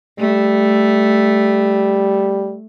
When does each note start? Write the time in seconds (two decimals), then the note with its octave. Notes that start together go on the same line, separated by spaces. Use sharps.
0.19 G3 A3